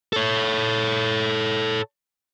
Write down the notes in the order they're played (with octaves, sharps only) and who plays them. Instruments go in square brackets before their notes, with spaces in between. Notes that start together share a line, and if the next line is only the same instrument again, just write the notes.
[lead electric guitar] A4 C#5